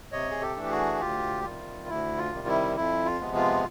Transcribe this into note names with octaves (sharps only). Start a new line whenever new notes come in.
C3 C#5 D#5
G#4
G4 A4
E3 A3 D4
G4
F#4 G#4
D2 F4 G4
C3 D#3 G3 F4
D2 E4
F4
C3 D#3 G3
E4
F2 E4
F4
C3 F3 G#3 B3
F4